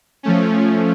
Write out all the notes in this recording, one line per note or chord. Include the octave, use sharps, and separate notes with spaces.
F3 A3 C#4